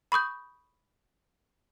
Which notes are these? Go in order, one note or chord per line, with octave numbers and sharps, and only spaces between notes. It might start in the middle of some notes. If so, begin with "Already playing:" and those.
B5 C#6 D#6 G6